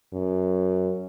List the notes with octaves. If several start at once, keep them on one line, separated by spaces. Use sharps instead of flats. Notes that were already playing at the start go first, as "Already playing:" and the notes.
F#2